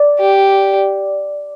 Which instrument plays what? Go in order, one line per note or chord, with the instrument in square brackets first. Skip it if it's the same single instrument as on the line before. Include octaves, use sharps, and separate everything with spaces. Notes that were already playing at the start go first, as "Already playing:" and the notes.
Already playing: [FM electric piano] D5
[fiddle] G4